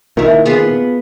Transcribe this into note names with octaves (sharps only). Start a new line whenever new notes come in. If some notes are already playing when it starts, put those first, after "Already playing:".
A#2 D#3 E4 A#4
B3 F4 G#4